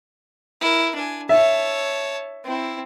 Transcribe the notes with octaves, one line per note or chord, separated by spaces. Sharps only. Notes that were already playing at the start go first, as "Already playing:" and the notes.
E4 A#4
D4 G#5
C#5 E5 A5
C4 E4